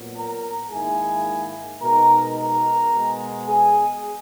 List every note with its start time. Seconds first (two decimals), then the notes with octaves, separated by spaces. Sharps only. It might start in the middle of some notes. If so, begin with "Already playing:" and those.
Already playing: A#2 F#3 B3
0.15 A#4 A#5
0.70 G#2 D#3 A#3 E4 G#4 G#5
1.81 B2 G#3 D#4 A#4 A#5
2.37 A#4 A#5
2.92 B2 G#3 B3
3.47 G#4 G#5